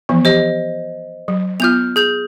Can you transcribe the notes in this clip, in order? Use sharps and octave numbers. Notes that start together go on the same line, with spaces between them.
E3 F3 B3
G4 C5 D#5
F#3
B3 F4 F6 G6 F7
G#4 G6 F7